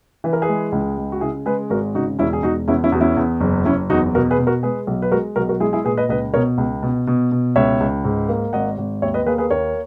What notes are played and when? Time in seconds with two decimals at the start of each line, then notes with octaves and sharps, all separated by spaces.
0.24 E3 B4
0.33 A#4
0.42 G#4 B4
0.49 G#3
0.72 C#2
0.97 G#3
1.12 F#4
1.21 C#3 E4 G#4
1.46 G#3 G#4 B4
1.70 G#1 F#4 A#4
1.95 C#3 D#4 F#4
2.19 E1 C#4 E4
2.33 G#4
2.43 E1 D#4 F#4
2.68 E2 C#4 E4
2.84 C#4 E4
2.92 E2 F#4
3.01 C#4 E4
3.17 E2
3.41 F#1
3.65 F#1 C#4 E4
3.90 E2 D#4 F#4
4.15 B2 F#4 A#4
4.31 G#4 B4
4.38 B2
4.47 F#4 A#4
4.63 G#3 G#4 B4
4.87 B1
5.02 B4
5.12 G#3 F#4 A#4
5.36 B1 F#4 A#4
5.49 F#4 A#4
5.60 G#3 E4 G#4
5.73 E4 G#4
5.85 A#2 G#4 B4
5.97 B4 D#5
6.09 C#2 B4 D#5
6.34 B2 A#4 C#5
6.58 C#2
6.83 B2
7.07 B2
7.32 B2
7.56 C#2 C#5 E5
7.80 C#2
8.04 G#2
8.29 A#3
8.53 G#1 D#5 F#5
8.78 G#1
9.02 D#2 C#5 E5
9.14 B4 D#5
9.27 A#3 G#4 B4
9.38 G#4 B4
9.51 D#2 A#4 C#5